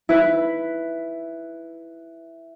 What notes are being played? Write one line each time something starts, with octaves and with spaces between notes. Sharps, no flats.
E4 B4